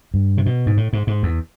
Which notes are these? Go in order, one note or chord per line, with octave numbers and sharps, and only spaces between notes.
G2
C3
B2
G#2
A2
G#2
G#2
E2